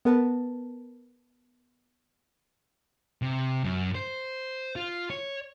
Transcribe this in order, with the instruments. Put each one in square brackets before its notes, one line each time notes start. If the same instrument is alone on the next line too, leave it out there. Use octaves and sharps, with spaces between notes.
[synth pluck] B3 A#4 B4 A5
[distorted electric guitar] C3
F#2
C5
F4
C#5